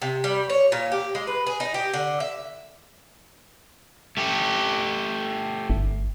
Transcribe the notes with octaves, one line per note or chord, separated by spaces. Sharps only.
C3
G3
C#5
A#2
G4
G#3
B4
G#4
D#4
G4
D3
E5
A3 G4
G1